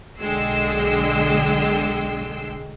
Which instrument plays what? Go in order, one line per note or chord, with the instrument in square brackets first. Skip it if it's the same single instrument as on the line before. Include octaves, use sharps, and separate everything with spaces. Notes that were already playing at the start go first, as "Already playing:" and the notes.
[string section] B1 D3 G#3 G5 E6 C7